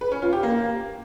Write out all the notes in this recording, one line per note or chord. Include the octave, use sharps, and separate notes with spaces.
B4
C#4
F4
G4
A#3